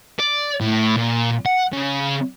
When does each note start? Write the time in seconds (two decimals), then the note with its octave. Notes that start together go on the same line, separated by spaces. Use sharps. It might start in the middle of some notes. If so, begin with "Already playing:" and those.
0.19 D5
0.61 A2
0.97 A#2
1.46 F#5
1.73 C#3